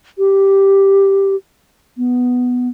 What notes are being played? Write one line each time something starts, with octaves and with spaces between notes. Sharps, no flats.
G4
B3